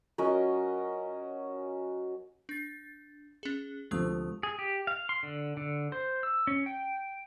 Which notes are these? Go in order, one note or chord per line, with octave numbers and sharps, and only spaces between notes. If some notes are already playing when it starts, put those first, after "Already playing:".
F#3 C#4 A#4 D#5
D4 A6
C#4 G#4
D2 C3 F3 G#3 D#6
G#4
G4
F5
C6
D3
D3
C5
E6
C#4
G5